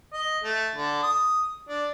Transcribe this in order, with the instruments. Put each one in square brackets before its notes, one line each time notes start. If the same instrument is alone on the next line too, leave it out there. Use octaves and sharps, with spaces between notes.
[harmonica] D#5
A3
D3
D#6
D4